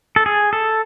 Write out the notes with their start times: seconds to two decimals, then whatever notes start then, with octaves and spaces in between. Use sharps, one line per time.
0.16 A4
0.26 G#4
0.53 A4